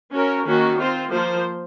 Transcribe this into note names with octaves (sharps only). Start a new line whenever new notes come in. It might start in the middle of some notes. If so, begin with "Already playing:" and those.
C#4 F#4 A#4 C#5
D#3 A#3 C#4 F#4
C4 F4 C5
F3 A#3 F4 C5